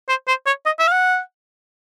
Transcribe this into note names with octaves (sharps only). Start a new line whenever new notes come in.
C5
C5
C#5
D#5
E5
F5
F#5